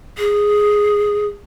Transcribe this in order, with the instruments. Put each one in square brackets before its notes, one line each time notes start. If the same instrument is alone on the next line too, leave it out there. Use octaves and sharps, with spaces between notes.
[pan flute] G#4